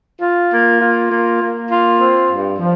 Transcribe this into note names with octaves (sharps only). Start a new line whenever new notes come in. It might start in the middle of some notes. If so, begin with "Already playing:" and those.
F4
A#3
F4
A#3
A#3
F4
C4
G2
F3